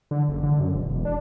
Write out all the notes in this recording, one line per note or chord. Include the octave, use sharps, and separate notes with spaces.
D3
F#1
D3
F#2
E1
E1
D4